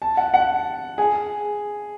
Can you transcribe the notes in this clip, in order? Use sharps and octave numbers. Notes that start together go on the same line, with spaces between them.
A5
F#5
F#5
G#4